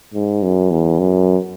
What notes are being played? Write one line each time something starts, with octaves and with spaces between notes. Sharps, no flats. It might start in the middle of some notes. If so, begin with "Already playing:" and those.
G#2
F#2
E2
F#2